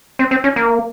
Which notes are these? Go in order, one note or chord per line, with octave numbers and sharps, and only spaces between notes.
C4
C4
C#4
A#3